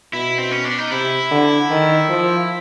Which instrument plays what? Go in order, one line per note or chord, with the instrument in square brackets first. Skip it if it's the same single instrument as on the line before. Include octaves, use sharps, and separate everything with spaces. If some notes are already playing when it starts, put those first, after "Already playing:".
[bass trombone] B2 [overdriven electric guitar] E4
[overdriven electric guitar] C4
C#4
D4
D#4
[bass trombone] C3 [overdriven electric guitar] E4
[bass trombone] D3
D#3
F3